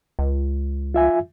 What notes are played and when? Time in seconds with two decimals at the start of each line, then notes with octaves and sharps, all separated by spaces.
0.19 C#2
0.94 F4 E5 G#5